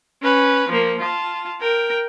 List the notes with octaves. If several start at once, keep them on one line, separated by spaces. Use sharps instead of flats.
C#4 B4
F3 A#3
F4 A5
A#4 G5